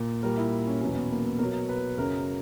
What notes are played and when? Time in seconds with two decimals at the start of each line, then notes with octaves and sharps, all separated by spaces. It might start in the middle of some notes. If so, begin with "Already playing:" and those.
Already playing: A#2
0.23 A#2 G3 A#4
0.37 E4
0.67 C#4
0.81 E2 B2 F#3 C#4
0.96 B3
1.11 A#3
1.25 B3
1.39 B2 F#3 A#4
1.69 B4
1.97 F#2 C#3 F#3 A#4